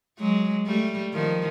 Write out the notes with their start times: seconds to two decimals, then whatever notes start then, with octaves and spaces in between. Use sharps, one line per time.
0.19 F#3 G#3
0.66 G3 A3
1.13 D#3 F3